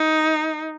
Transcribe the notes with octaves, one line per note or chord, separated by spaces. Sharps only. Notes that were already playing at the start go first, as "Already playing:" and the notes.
Already playing: D#4